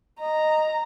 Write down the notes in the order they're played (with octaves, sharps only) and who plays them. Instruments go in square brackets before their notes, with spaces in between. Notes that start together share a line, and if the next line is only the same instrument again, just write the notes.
[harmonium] D#5 [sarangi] A#5